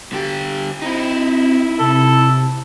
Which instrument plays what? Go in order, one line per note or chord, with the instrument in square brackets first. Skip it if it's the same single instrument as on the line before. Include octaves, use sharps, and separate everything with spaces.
[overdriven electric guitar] D3 G4
[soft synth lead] C4 [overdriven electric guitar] D#4 E4
[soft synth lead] C3 [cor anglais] A4